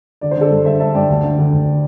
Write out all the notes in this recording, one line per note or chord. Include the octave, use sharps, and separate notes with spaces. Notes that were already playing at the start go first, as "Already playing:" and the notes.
D3 D5
C5
D3 A4 D5
G2
D3 C5 E5
G2 E5 A5
G2 D5 G5
D2
D3
D3
D2